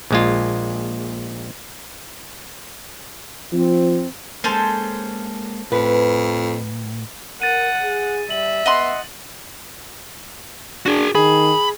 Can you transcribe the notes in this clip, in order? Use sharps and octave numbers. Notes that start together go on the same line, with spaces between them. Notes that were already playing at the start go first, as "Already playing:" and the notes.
A#1 G#3 F4
F3 C4
G#3 A#3 C#4 A4 C5
F2 A2 B4
A#4 F#5 A6 D#7
G#4
G3 E5 F#7
B3 D#5 F#5 C6
D4 F#4 G#4
D#3 G#4 B5